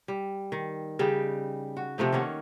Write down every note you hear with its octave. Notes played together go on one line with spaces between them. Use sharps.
G3
D#3
C#3 G3 D#4 G4
F#4
C3 F3 A3 D#4
D#3 A#3 C#4 F#5